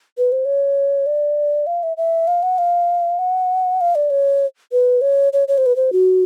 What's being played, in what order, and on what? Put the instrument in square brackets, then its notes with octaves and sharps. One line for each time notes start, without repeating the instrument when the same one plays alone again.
[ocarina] B4
C5
C#5
D5
F5
E5
E5
F5
F#5
F5
F#5
F5
D5
C#5
B4
C#5
C#5
C#5
C5
B4
C5
F#4